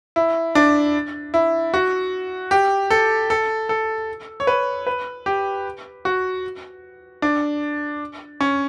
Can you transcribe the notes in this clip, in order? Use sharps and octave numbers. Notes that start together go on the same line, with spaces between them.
E4
D4
E4
F#4
G4
A4
A4
A4
C#5
B4
B4
G4
F#4
D4
C#4